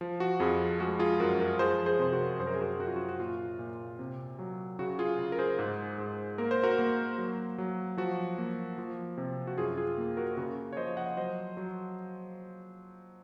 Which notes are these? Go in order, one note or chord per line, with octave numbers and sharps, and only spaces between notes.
F3
F#4
F2 F4 G#4
G#3 F#4
F4 G#4
F#2 F#4 A#4
F#4 A#4
F3 G#4 C5
G#4 C5
C3 C5
F#4 A#4
F#2 C5
A#4
G#4
F#4 A#4
F#2 F#4
F4
F#4
F#4
A#2 F4
A#2
C3
F#3
C#3 F#4
F4 G#4
C#3
A#4
G#4 C5
G#2
G#2
A#3 A#4
C5
F#4 A#4
A#3
F#3
F#3
F3 F#4
A#3
F3
C3
F#4
F#2 F4 G#4
F4 G#4
A#3
F#4 A#4
C#3 F#4 A#4
C#5
F3 C5 D#5
D#5 F#5
F#3 C5 D#5
F#3